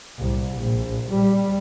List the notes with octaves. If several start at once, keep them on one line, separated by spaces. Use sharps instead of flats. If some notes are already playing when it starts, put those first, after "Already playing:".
C2
A#1
G3